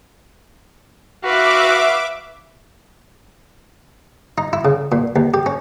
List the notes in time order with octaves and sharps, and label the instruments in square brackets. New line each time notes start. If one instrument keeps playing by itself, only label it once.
[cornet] F#4 [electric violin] B4 F5 [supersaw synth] E5 D6
[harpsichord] D#4
E4
C#3
A#2
D#2
G4
C#4